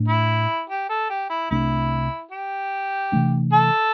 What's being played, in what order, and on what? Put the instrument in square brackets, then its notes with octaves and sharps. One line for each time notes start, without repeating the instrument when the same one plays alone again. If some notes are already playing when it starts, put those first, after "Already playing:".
Already playing: [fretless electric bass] A2 A3 D4
[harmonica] E4
G4
A4
G4
E4
[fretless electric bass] C2 C3 A3 D4 [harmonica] E4
[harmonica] G4
[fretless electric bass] C3 E3 A3 D4
[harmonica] A4